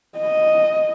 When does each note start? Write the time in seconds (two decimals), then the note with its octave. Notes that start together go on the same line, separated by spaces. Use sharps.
0.18 D#5